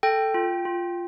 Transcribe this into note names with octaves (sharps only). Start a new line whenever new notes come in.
A4 G5
F4
F4